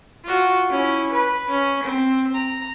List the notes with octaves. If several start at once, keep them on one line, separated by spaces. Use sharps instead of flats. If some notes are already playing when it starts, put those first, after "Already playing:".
F4 F#4
C#4 E4
B4
C#4
C4
A#5